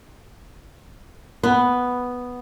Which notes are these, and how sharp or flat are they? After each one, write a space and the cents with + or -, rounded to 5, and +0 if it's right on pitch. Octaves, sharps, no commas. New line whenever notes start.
B3 +0